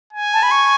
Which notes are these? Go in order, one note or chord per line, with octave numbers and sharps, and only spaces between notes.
G#5
A5
B5
C#6